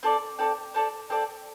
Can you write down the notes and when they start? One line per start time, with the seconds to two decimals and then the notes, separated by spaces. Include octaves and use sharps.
0.03 C4 A4 D5
0.39 C4 A4 D5
0.74 C4 A4 D5
1.10 C4 A4 D5